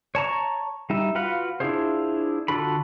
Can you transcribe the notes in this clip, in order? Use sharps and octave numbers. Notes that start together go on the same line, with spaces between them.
C#5 A5 A#5 C#6
G3 D#4 E5
F4 F#4 B4 F5 F#5
D4 E4 F4 G#4 C5
D3 F4 F#4 A4 B5